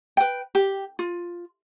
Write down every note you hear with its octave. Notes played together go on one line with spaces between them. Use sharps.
B4 G5
G4
F4